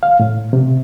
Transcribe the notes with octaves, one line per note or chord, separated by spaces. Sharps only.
F5
A2
C3